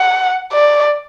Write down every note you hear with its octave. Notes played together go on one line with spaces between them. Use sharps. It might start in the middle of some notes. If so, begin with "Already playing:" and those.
Already playing: F#5
D5